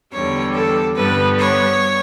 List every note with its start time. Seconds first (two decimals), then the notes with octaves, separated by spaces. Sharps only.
0.12 E2 D3 G3 C#5
0.54 A4
0.96 G2 D3 G3 B3 B4
1.38 C#5